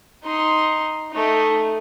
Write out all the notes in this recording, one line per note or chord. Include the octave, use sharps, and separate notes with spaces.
D#4 C6
A3 D#4